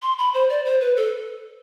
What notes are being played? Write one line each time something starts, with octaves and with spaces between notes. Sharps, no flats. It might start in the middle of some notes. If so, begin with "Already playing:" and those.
C6
B5
C5
D5
C5
B4
A4